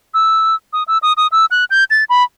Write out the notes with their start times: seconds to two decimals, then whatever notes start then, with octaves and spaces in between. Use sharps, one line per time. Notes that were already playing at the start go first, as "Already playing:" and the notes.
0.14 E6
0.73 D#6
0.88 E6
1.03 D#6
1.17 D#6
1.32 E6
1.51 F#6
1.70 G6
1.90 A6
2.10 B5